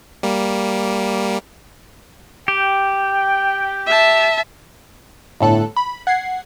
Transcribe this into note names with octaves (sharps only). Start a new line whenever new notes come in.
G3 A#3
G4 G5
E5 A5
G1 A2 A4 F#6
B5
F#5 G#6 C7